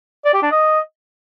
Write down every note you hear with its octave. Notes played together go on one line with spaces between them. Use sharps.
D5
G4
D4
D#5